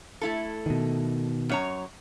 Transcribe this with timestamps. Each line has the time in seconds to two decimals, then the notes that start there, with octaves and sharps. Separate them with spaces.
0.21 A3 E4 A4
0.66 B2 D#3
1.49 F#2 C#5 A#5